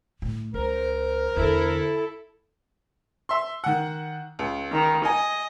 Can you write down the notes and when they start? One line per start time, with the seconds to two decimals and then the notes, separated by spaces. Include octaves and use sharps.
0.22 A2
0.54 C#2 A#4 C5
1.36 E2 D3 E4 A4
3.29 E5 C6
3.64 D#3 F#5
4.39 C#2
4.72 D#3
5.05 D#5 G#5